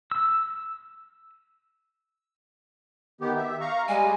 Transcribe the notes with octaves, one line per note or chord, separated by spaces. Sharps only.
E6
D#3 B3 G4
E5
F5 A#5 C#6
G3 G#3 G#5